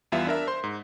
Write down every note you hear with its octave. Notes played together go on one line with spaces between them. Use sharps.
E2 G3 B3 F4 E5
D4 A#4 E5
C5 C6
G#2